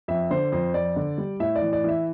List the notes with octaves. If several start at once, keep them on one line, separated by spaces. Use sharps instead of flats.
F2 E5
D3 C5
F2 C5
F2 D5
D3
G3
A2 E5
D5
E3
D5
E3 E5